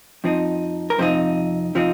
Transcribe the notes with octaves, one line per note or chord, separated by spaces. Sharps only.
F2 F3 C4 D#4
A#4
F2 C3 F3 C4 D#4 C5
C3 F3 C4 D#4